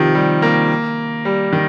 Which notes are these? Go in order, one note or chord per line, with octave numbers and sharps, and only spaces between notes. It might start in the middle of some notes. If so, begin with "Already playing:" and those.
Already playing: C3 D#3 F3
G3
A#3
G3
D#3